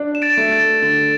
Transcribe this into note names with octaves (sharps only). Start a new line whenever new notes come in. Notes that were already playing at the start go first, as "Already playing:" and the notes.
Already playing: D4
E7
A6 D7
A3
A6
D3 A6